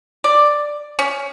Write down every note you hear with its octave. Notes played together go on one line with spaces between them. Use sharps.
D5
C#4